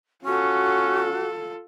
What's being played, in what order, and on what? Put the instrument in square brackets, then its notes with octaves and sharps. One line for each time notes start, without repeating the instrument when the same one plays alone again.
[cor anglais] C#4 [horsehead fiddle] F4 A4 [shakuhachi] F#4